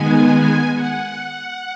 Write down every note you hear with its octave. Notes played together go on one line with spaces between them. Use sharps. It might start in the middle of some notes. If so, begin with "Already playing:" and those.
Already playing: D#3 G#3 B3 G#5
F#5